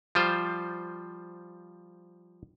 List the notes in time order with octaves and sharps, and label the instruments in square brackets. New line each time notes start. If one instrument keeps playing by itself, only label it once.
[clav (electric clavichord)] F3 G3 F4 C5